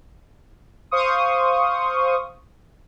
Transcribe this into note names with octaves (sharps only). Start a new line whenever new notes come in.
C5 F5 C6 C#6 D#6